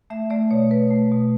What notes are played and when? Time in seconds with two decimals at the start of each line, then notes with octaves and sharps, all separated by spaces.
0.10 A3 E5
0.30 A3 D5
0.51 B2 C#5
0.71 B2 B4
0.91 A3
1.12 B2